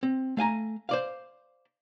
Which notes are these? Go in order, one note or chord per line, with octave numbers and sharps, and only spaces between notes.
C4
A3 F5 G#5 A#5
C5 D5 F5